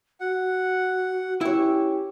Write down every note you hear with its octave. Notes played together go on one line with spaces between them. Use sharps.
F#4 F#5
C#4 E4 G4 C#5